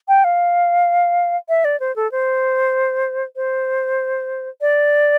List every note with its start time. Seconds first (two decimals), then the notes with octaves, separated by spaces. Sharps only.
0.08 G5
0.24 F5
1.49 E5
1.65 D5
1.80 C5
1.96 A4
2.12 C5
3.36 C5
4.61 D5